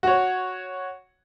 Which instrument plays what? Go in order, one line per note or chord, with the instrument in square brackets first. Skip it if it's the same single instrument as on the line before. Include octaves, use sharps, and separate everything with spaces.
[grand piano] F#4 C#5